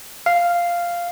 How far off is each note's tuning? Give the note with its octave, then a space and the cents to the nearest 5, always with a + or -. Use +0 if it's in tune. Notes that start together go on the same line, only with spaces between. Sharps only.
F5 -5